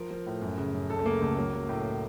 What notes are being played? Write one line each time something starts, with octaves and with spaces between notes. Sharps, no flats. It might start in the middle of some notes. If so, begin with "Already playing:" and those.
Already playing: F3 A#4
F3
A2
F#2
C#3
F#2
C#2 A4
A3
C#3 A#3
C#2 A3
F#3 A#3
F#3
A2